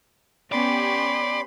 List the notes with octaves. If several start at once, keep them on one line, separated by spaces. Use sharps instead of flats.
B3 C#4 G4 D5 B5 C6